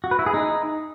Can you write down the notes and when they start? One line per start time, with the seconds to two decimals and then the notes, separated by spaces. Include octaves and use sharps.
0.04 F#4
0.11 B4
0.19 E4
0.26 G#4
0.34 D#4